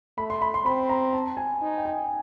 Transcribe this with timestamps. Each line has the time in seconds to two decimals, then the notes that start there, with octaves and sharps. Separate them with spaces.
0.18 A3 B5
0.30 C6
0.42 B5
0.54 C6
0.65 C4 B5
0.89 A#5
1.13 A5
1.37 G#5
1.62 D#4
1.78 G5
1.85 G#5